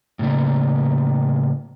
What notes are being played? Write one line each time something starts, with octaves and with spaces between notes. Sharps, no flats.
A2 C#3 A#3